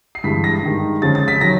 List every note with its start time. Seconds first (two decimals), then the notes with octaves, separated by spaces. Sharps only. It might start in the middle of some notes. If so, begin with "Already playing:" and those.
0.15 C7
0.24 G2 E3 G#3 B6
0.44 A#6
0.63 G2 D#3 G#3
1.02 F2 C#3 F3 G#3 A6
1.15 A6
1.28 B6
1.41 C3 D#3 F#3 A#6